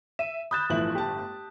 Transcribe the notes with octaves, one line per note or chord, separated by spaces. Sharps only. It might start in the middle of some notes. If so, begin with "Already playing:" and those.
E5 D#7 E7
B5 D#6 F#6 G6 A6 E7
G1 A2 E3 F3 E4 F#7
G4 A5